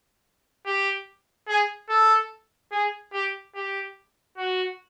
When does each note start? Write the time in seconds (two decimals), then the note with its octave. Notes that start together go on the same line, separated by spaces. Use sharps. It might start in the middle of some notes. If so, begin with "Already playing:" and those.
0.66 G4
1.48 G#4
1.89 A4
2.72 G#4
3.13 G4
3.55 G4
4.37 F#4